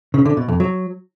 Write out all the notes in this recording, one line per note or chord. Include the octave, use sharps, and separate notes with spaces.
C#3
D3
B2
F2
F#3